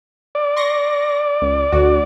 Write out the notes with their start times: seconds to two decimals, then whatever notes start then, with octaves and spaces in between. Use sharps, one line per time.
0.35 D5
0.56 C6 C#6 A#6
1.42 C#2
1.72 D2 F#4